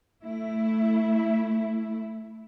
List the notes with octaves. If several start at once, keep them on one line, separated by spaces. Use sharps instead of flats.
A3 E4